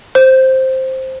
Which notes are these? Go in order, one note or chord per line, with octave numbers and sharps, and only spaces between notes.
C5